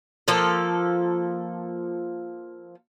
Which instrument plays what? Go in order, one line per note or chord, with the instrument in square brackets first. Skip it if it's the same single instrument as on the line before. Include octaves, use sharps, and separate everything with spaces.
[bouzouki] F3 A#3 A4